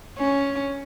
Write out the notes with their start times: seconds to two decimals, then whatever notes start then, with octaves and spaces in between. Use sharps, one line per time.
0.18 C#4